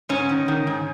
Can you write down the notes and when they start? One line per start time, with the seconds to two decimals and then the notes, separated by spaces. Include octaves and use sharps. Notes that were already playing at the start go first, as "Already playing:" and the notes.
0.09 G#2 C#4
0.29 D#3
0.48 D#3
0.67 G#2